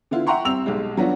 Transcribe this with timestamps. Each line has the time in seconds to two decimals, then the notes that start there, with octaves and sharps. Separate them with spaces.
0.11 D3 B3 E4 F4
0.27 E5 F#5 G5 A#5 C6 C#6
0.45 G3 C4 E6 F7
0.66 B1 G3 G#3
0.97 F#3 B3 D4 F4 F#4